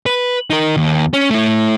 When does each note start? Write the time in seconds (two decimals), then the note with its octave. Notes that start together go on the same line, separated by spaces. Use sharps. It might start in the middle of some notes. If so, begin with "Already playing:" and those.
0.06 B4
0.50 D#4 A#4
0.77 D#2
1.13 C#4
1.30 A3 E4